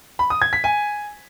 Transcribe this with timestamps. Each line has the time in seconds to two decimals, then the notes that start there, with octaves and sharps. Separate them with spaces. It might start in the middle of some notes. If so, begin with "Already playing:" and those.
0.19 B5
0.30 D#6
0.42 G#6
0.53 B6
0.64 G#5